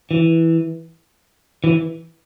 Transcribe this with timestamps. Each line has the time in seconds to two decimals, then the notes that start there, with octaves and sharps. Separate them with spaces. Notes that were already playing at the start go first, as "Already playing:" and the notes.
0.11 E3
1.64 E3